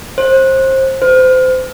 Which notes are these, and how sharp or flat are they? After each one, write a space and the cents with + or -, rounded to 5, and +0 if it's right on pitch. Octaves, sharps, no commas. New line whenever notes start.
C5 +25
C5 -30